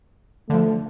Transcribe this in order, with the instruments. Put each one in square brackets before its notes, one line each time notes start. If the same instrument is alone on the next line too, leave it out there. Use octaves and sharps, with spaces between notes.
[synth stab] D3 F3 [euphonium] A3